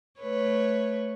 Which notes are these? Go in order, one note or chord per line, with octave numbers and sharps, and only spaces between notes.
A3 B4 C#5